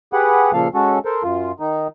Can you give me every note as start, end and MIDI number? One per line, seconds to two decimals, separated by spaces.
0.13 0.52 67
0.13 0.52 68
0.13 0.52 71
0.13 0.52 78
0.53 0.68 46
0.53 0.68 49
0.53 0.68 53
0.53 0.68 58
0.53 0.68 69
0.53 0.68 77
0.74 0.99 56
0.74 0.99 61
0.74 0.99 66
0.74 0.99 69
1.05 1.23 69
1.05 1.23 70
1.05 1.23 72
1.23 1.52 42
1.23 1.52 65
1.60 1.88 51
1.60 1.88 63